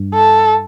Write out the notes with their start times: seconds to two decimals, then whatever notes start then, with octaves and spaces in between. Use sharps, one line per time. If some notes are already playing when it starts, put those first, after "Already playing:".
Already playing: G2
0.14 A4